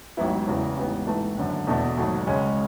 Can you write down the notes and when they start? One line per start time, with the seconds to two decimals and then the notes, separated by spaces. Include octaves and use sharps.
0.17 A1 G#2 F#3 B3 E4
0.47 E2 C#3 E3
0.77 A1 G#2 E3 B3
1.07 G#2 E3 A3
1.37 G#1 F#2 D3
1.67 E2 B2 A3
1.98 G#1 G#2 F#3 A3
2.27 C#2 C#3 G#3 C#4